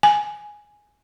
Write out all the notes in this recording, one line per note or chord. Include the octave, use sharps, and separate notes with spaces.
G#5